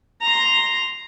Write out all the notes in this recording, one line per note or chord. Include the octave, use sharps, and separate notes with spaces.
A#5 C6